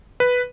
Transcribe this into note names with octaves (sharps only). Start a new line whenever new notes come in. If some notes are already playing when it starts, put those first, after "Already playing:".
B4